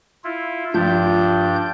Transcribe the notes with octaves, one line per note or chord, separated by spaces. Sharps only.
E4 F4
G2 F3 D4 G6